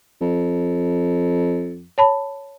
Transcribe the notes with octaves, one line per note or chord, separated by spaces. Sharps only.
F2
C#5 A5 B5